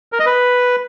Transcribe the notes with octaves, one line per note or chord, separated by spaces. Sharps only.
A#4
D#5
B4